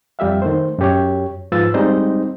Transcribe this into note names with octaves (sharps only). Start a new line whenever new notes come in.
F2 G3 G4 E5 F5
D#3 A3 C5
F#2 G4 C#5
G#2 F3 F4 B4 E6 A6
G3 G#3 C4 D#4 C5 D#5